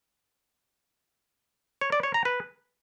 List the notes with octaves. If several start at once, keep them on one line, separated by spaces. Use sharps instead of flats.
C#5
D5
C#5
A#5
B4